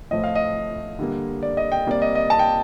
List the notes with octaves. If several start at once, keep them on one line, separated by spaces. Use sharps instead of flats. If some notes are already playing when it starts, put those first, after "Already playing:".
A2 F3 A3 D#5
F5
D#5
D3 G3 A#3
D5
D#5
G5
C3 G3 A#3 D5
D#5
D#5
A5
G5